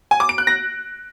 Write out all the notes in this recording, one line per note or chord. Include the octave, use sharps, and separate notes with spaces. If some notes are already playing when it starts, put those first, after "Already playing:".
G#5
D6
D7
F#6
A#6